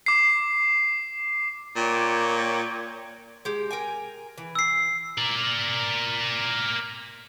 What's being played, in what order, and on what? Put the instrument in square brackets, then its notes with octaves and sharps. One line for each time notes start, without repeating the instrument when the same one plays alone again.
[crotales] D6 C7
[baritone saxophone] A#2 [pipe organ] C#5 G5 D6
[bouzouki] G#3 G4
A#4 G5 G#5
E3
[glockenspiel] E6 C7
[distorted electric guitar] A#4 D5